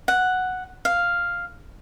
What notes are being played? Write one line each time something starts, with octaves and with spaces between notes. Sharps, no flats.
F#5
F5